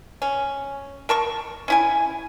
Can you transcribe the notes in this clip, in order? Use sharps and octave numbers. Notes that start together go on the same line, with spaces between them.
C#4
A#4 A5 C#6
C#4 E4 G#5